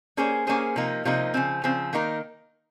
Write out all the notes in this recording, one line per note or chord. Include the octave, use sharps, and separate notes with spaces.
A#3 C#4 G#4 C5
A#3 C#4 G#4 C5
C3 F3 A#3 D#4
C3 F3 A#3 D#4
C#3 F3 C4
C#3 F3 C4
D#3 A#3 D#4 A#4